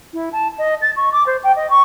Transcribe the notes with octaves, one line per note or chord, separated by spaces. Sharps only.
E4
A5
D#5
A6
C#6
D6
C5
G5
D#5
C#6